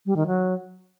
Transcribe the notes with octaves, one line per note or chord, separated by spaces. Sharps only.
G3
D#3
F#3